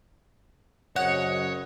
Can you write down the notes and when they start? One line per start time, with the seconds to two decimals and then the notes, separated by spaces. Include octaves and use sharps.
0.96 C2 F#2 C#3 C#5 D#5 F#5